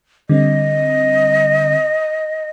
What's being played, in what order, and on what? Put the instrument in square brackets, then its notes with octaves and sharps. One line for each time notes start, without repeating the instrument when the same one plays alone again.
[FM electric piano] D3 G3 C4 [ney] D#5